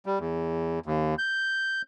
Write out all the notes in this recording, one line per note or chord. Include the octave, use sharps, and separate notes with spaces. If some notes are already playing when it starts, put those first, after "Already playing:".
G3
E2
D#2
G6